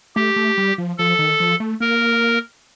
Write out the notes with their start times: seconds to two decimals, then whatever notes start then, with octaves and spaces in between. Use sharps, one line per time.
0.16 A3 G4
0.36 A3
0.57 G3
0.78 F3
0.98 F3 A4
1.19 D#3
1.40 F3
1.60 A3
1.80 A#3 A#4